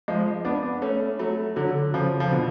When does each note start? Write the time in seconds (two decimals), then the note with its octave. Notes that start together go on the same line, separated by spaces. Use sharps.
0.08 F3 G#3
0.45 B3 D4
0.82 A3 C#4
1.19 F#3 A3
1.56 D3 F#3
1.94 C#3 F3
2.20 F3
2.31 B2 D3